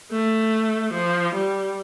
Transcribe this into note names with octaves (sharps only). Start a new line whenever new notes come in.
A3
F3
G3